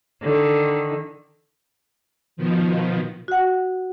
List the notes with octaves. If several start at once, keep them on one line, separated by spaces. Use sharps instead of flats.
D3 D#3
B2 D#3 F3
F#4 F#5